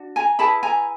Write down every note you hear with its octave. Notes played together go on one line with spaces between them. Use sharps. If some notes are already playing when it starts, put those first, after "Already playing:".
Already playing: D4 F#4
G#5 A#5
E4 G#4 B4 A5 B5
G#5 A#5